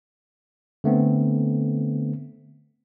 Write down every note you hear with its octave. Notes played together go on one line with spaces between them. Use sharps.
D3 A3 B3 C4